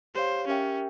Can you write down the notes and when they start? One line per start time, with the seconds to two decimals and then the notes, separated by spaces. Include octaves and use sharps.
0.15 G4 C5 C#5 F5
0.48 C#4 G4 A#4 E5 G5